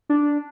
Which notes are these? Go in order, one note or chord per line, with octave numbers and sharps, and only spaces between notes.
D4